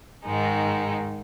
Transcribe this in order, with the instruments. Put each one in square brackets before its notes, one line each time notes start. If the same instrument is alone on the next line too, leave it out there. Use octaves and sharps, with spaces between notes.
[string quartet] G#2 D#3 G#3 D#4